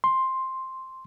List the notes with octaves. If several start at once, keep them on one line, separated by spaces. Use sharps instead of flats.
C6